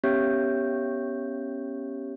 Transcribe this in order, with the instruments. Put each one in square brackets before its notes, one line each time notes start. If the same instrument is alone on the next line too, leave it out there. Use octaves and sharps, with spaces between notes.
[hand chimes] B3 C#4 G4 C#5 E5 G6